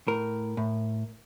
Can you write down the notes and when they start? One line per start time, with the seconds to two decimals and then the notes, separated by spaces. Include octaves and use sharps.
0.07 A2 A#4
0.57 A2